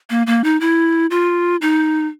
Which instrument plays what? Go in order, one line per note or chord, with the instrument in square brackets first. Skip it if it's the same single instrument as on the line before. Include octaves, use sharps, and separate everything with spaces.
[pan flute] A#3
A#3
D#4
E4
F4
D#4